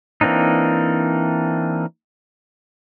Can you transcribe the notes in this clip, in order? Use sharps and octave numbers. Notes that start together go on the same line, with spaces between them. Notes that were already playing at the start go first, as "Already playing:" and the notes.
E3 A#3 C4 D4 D#4